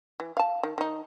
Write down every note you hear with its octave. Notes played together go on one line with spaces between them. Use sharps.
E3
F5 A5
D#3
D#3 D#4